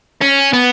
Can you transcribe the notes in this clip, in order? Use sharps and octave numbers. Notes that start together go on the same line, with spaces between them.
C#4
B3